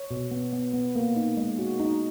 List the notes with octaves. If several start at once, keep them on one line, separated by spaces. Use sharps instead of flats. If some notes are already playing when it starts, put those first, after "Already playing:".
Already playing: C#5
B2
B3
B3
B3
A#3
D#4
G#3
F#4
D#4